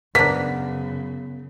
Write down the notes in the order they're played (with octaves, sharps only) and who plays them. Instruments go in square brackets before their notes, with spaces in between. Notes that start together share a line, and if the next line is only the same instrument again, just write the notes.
[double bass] F#2 C#3 [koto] A#3 D4 [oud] B3 [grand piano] B6